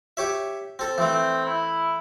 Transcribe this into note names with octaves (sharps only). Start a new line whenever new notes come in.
G4 C#5 E5
C4 A4
E3 A3 C4
E4